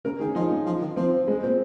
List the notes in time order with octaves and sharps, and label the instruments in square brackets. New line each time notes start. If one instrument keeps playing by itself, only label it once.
[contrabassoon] C#3 [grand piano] A#4
[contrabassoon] D#3 [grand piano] G#4
[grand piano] C#4
[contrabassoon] F3 [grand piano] D#4
[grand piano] C#4
[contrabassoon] F3
D#3
[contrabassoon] F3 [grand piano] C4
[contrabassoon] C#3 [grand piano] G#3
[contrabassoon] A#2 [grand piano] C4